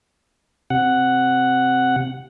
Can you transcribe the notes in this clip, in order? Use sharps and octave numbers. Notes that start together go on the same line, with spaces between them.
C3 F#5